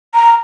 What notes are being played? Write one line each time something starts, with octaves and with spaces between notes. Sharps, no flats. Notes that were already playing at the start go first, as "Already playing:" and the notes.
A#5